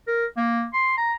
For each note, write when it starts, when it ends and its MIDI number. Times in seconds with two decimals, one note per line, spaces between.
0.07 0.25 70
0.37 0.65 58
0.73 0.94 84
0.97 1.13 82